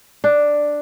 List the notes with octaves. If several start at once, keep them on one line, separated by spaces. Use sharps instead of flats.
D4